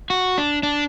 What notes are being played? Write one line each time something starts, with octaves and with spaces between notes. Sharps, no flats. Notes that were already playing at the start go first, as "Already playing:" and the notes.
F#4
D4
D4